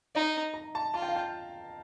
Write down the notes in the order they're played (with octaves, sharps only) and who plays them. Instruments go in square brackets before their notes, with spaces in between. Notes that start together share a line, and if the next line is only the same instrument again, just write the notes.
[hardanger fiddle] D#4 [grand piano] D#5
[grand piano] A#5
A5
[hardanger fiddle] F4 [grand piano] A5
[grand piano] G5
F5
G5